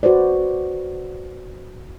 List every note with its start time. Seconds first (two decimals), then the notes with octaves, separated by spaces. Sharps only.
0.03 F#4 B4 C5 D5